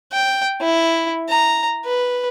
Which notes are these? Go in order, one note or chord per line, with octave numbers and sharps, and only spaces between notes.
G5
E4
A#5
B4